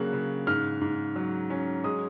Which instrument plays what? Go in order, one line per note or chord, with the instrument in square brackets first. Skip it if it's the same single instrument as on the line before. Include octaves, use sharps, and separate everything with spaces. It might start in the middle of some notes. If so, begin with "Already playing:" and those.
Already playing: [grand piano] C#3 F#3 A#3 F#6
C#3
G#2 F6
G#2
F#3
C#4
G#3 D#6